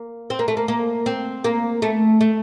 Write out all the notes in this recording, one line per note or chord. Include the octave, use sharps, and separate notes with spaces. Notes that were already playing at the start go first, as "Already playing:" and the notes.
Already playing: A#3
C4
A#3
A3
A#3
A#3
C4
A#3
A3
A3